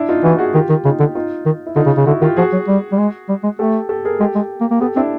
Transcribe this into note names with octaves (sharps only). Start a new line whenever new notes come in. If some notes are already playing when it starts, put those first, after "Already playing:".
Already playing: D4 E4
D#4 F4
E3 E4 F#4
F#4 G#4
D#3 F4 G4
D#3
C#3 D#4 F4
D3
D#4 F4
D#3
E4
D3 D#4 F4
C#3
C#3
D3 E4 F#4
D#3 F4 G4
F3 F#4 G#4
F#3
G3
G3
G#3
G3
G#3
A3 G4 A4
G4 A4
G#4 A#4
G#3 G4 A4
G#3
A#3
A#3
B3 G4 A4
C4 D4 E4